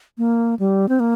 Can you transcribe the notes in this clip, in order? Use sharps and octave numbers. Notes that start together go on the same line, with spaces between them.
A#3
G3
C4
A#3